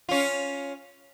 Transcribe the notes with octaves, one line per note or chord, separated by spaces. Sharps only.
C#4 F4